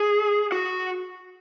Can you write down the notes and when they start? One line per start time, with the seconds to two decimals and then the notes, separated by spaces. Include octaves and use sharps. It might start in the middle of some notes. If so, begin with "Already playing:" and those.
Already playing: G#4
0.52 F#4